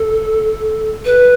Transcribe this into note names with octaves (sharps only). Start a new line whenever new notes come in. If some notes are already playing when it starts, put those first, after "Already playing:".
Already playing: A4
B4